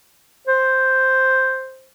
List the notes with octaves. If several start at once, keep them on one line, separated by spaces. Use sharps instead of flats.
C5